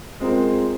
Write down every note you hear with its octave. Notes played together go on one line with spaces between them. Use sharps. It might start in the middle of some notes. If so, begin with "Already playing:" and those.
G#3 C4 F4 A#4